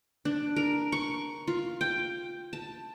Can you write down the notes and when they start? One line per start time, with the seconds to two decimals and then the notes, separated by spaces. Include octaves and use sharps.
0.25 D4
0.56 A#4
0.92 C#6
1.47 F4
1.81 G5
2.53 A5